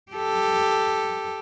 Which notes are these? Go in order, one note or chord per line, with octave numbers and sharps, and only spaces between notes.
G4 A4